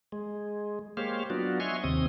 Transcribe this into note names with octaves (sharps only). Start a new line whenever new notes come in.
G#3
G#3 A#3 G4 C5 C#5 F5
F#3 B3 D4 F4 F#4
C#5 D#5 E5 G#5 C6 C#6
D#2 C3 C4 D#6